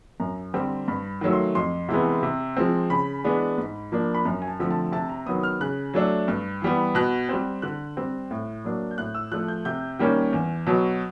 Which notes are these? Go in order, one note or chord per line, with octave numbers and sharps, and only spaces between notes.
F#2 A#5
D3 G3 C4
G2 B5
D#3 F#3 A3
C6
F2 C6
C3 E3 G#3 B3
C3
F3 G#3 C4
C#3 B5
E3 G#3 B3 D4
G#2
F3 A#3 D4
B5
F#2 A#5
G#5
A5
D3 F3 A3 C4
A5
C3 A5
A#5
D#3 F#3 B3 D#6
F6
C#3 F#6
F#3 A3 D4
G2
E3 G3 B3
B2 F#6
G3 C4
D3 F#6
G3 C4
A2
F#3 A#3 D4
G6
A2 F#6
E6
F3 A3 F#6
G6
C3 G6
D#3 G3 A#3 C#4
E2
B2 F#3